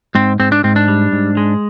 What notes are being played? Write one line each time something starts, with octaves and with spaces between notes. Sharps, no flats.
G#2 C4
G#2 C4
D4
G#2 C4
D4
G3
G#2
G#3